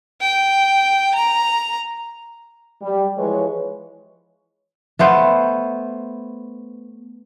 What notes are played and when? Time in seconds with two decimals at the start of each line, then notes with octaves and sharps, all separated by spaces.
0.21 G5
1.14 A#5
2.82 G3
3.18 E3 F3 G#3 B4 C#5
4.99 A3 B3 C5 F5